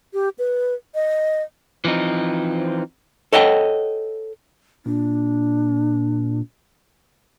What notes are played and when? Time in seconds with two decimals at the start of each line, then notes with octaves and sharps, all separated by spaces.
0.14 G4
0.39 B4
0.95 D#5
1.85 E3 F3 C4 D#4
3.33 A4 C#5 D#5 F#5 G5
4.86 A#2 D4